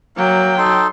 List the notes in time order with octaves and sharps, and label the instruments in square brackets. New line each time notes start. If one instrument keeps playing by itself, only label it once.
[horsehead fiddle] F#3 G5 [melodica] A#3
[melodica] D#4 A4 C6